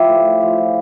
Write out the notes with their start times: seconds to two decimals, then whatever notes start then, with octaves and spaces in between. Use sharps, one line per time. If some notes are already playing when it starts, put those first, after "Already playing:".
Already playing: F3 E4 G4
0.09 A2
0.25 A2
0.41 F3
0.57 F3